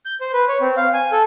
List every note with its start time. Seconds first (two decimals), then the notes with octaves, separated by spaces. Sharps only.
0.05 G6
0.21 C5
0.33 B4
0.49 C#5
0.61 C4
0.77 F5
0.94 G#5
1.12 A4